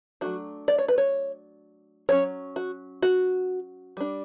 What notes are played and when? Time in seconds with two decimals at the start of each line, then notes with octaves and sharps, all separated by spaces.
0.21 F#3 A3 D4 F#4
0.68 D5
0.78 C#5
0.88 B4
0.98 C#5
2.09 F#3 C#4 C#5
2.56 F#4
3.02 F#4
3.97 G3 D4